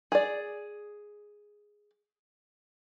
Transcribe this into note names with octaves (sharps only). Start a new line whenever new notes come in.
G#4 D5